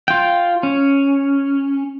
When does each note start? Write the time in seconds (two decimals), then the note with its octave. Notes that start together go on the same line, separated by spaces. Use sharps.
0.08 F4 G5
0.63 C#4